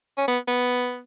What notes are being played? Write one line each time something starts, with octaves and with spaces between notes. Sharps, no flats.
C#4
B3
B3